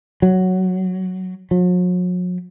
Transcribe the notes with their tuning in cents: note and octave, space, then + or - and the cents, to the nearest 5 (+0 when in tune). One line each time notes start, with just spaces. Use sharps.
F#3 +5
F#3 -45